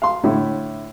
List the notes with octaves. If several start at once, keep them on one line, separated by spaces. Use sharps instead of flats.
F5 C6
A2 D3 E4